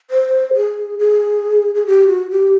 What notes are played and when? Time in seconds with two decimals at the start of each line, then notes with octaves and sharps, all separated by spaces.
0.10 C5
0.54 G#4
0.99 G#4
1.75 G#4
1.87 G4
2.08 F#4
2.30 G4